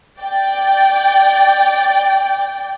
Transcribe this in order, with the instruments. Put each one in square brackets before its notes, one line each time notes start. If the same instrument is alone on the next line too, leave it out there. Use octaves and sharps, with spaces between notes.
[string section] D5 G5